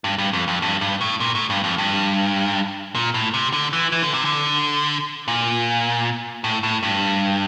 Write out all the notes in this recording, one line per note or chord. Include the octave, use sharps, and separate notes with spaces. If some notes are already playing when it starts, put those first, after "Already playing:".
G2
G2
F2
F2
G2
G2
A2
A#2
A2
G2
F2
G2
A#2
A2
C3
D3
E3
E3
D3
C3
D3
A#2
A2
A2
G2